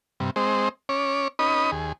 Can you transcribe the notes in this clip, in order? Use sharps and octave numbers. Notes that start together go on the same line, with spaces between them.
G2 C3
G#3 C4 C5 D#5
C#4 C#5 D6
C#4 D#4 B4 D#5 B5 D#6
D#2 G#4